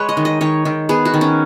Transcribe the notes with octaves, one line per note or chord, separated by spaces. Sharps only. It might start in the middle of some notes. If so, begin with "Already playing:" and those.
Already playing: G#3 B4 C#5
D#5
D#3
D#5
D#3 C#5
D#3
B3 G#4
F#4
D#3
C#4